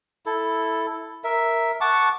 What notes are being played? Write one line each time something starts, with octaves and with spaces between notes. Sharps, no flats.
E4 A4
A#4 E5
F#5 A5 C#6 D6